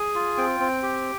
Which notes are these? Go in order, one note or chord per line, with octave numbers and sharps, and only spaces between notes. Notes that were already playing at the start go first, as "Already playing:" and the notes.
Already playing: G#4 G#5
F4
C4 G5
C4
G4